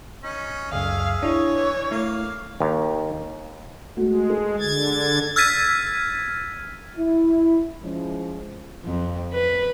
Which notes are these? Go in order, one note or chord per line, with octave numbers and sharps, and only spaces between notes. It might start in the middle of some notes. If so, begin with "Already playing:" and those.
C#4 D#4
C#2 F#2 G#4 E5 F5
D4 E4 C#5
E3
A3 A#3 E4 F5
D#2
G#3 A3 F#4
G#4 A4
D3 G#6 A6
E6 F6 G#6 A6 B6 D#7
E4
F3 G#3 C#4
F2
B4